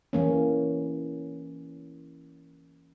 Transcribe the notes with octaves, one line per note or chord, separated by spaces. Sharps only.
E3 A#3 C#4